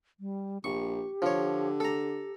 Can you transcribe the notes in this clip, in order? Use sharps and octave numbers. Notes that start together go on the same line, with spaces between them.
G3
A#1 G4 C#6
D3 F3 C#5
A4 A#5